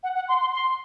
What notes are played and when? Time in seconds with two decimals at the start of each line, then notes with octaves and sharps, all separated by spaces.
0.03 F#5
0.15 F#5
0.28 C6
0.40 C6
0.53 C6